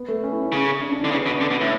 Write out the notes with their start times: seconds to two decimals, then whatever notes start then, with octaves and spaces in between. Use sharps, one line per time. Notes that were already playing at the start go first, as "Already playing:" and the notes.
Already playing: B3
0.08 A3
0.23 C#4
0.33 E4
0.42 C#4
0.52 C#3
0.81 D4
0.92 D4
1.02 D3 E4
1.11 C#3 B3
1.26 B2 D4
1.41 D3 D4
1.51 B2
1.61 A2